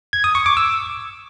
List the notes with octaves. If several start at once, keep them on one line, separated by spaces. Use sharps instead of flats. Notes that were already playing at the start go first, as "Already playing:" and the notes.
G#6
D#6
C#6
D6
E6